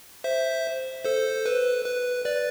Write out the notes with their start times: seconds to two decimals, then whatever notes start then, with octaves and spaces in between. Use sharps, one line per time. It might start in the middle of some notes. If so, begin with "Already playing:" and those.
0.24 C5 E5
1.05 A4 C5
1.46 B4
1.85 B4
2.25 B4 D5